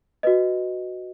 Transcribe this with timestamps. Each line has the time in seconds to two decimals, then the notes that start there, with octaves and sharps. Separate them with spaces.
0.23 F#4 B4 D#5